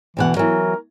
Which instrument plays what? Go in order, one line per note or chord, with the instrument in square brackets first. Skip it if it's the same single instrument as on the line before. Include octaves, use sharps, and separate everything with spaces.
[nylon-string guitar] D2 B2 F#5 [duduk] E3
[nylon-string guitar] E3 F#3 [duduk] A#4